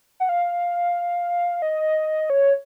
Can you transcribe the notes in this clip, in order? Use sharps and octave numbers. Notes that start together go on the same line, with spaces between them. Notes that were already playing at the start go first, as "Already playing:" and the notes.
F#5
F5
D#5
C#5